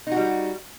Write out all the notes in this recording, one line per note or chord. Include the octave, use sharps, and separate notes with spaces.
G3 D#4 F#4